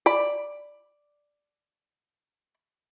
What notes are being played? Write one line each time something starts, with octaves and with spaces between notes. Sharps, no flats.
D5 B5